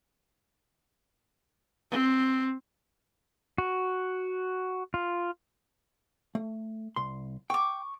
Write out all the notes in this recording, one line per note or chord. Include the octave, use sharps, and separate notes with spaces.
C4
F#4
F4
A3
C2 C6
G5 C#6 D6